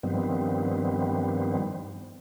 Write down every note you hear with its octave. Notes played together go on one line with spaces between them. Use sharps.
G2 D#3 F3 G3 B3 C4